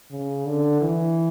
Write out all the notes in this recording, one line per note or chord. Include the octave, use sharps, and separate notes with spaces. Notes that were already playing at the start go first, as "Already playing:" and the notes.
C#3
D3
E3